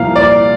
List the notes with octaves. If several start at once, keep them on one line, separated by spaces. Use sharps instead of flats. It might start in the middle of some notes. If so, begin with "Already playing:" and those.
Already playing: C2 A#2 F3 A#3 F5
D5